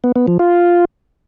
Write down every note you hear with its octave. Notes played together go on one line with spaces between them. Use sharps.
B3
B3
F3
F4